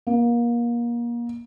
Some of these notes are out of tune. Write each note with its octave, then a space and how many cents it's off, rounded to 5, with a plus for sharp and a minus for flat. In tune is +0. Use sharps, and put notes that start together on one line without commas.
A#3 +30